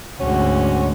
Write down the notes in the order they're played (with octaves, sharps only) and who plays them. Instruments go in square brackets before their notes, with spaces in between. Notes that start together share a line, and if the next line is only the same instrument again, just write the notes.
[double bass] D2 G#2 [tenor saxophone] C#4 [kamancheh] F#4